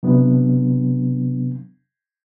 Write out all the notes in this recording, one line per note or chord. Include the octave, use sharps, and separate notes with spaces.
C3 F#3 B3 D4